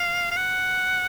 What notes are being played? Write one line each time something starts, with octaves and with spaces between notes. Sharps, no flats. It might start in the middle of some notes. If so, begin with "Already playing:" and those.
Already playing: F5
F5
F#5